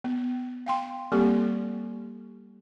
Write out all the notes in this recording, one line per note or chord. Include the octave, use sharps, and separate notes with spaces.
B3
F5 G5 C6
G3 A#3 C4 G4 A4